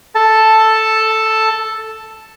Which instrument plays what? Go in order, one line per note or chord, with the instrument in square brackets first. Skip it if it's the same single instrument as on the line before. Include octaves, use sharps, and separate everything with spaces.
[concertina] A4 A5